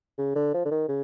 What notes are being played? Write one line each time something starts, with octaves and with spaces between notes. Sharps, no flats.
C#3
D3
F3
D3
D#3
C#3